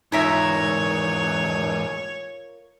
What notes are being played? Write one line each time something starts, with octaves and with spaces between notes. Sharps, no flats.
E2 G#2 D#4 F4 A#4 C#5 E5 B6